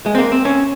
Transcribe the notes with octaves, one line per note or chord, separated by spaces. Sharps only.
G#3
C4
A#3
C4
C#4